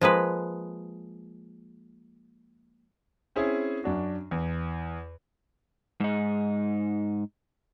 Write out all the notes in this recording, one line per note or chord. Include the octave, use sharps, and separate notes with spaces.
F3 G#3 A#3 B4
C4 C#4 E4 G#4
F#2 D4 F#4
E2
G#2 D#4